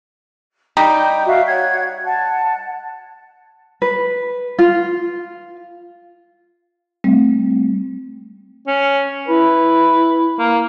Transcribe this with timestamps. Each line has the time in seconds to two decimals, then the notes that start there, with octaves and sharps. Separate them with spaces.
0.77 G3 D#4 G5
1.26 F#4 E5 F5
1.47 C#5 F#5 G#6
2.04 F#5 A5
3.82 B4
4.59 F4
7.04 G3 A3 C4
8.67 C#4
9.28 E4 B4
10.39 A#3